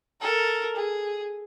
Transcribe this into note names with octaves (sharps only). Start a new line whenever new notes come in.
A4 A#4
G#4